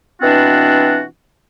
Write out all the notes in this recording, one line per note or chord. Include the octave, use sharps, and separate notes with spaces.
B2 E3 C4 D4 F4 F#4